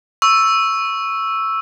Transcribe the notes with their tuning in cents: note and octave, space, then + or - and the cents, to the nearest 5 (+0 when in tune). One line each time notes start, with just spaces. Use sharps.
C#6 +0 E6 +0